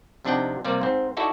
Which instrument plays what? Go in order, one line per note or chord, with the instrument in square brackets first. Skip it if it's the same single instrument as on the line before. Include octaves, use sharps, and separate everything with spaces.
[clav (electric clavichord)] F2 C3 D4 D#4 F#5 G5
C3 G3 A#3 D5
G#2 C4
D#4 E4 F#4 A4 D5